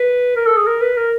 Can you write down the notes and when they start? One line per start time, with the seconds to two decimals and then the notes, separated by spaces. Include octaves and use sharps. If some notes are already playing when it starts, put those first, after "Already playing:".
Already playing: B4
0.36 A#4
0.47 A4
0.57 G#4
0.67 A#4
0.81 B4
0.97 A#4